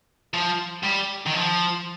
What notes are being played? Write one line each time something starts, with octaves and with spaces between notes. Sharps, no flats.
F3
G3
D#3
F3